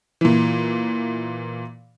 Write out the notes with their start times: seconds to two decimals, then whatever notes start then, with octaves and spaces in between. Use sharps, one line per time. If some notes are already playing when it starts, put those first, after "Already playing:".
0.21 A#2 E3